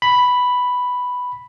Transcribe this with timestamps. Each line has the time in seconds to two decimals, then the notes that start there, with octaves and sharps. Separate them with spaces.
0.02 B5